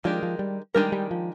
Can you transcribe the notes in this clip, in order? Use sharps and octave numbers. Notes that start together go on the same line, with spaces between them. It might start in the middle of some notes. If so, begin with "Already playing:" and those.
D#3 F3 G#3 D4 G4 A#4
F3
G3
D#3 G3 G#3 D4 G4 A#4
G3
F3